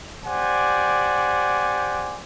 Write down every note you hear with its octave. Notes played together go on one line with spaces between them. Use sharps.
G4 C5 D5 F#5 G#5